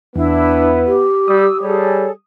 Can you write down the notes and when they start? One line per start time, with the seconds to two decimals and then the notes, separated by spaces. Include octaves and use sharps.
0.16 E2 B3 D4 E4 B4
0.86 G4
1.28 G3 D#6 E6
1.61 G3 G#4 A4 C#5